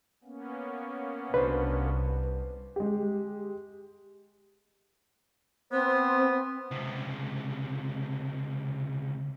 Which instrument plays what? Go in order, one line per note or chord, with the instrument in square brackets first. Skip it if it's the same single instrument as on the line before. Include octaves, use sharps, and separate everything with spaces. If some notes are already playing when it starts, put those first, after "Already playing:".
[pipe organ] A#3 B3 C#4
[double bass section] C2 [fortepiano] D4 F#4 C5 [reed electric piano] B4
[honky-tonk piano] G#3 G4
[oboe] B3 [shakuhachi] C4 [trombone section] C5
[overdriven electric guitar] C#2 C3